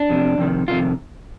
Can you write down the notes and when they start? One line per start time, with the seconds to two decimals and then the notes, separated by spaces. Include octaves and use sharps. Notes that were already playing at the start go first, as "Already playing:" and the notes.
Already playing: D4
0.09 F2 C3
0.38 F2 C3 D#3
0.68 F2 C3 D#3 F4